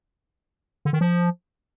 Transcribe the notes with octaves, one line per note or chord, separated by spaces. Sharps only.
D3
D#3
F3